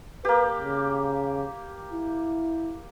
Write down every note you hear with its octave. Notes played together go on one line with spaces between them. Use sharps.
A#3 G4 B4
C#3
E4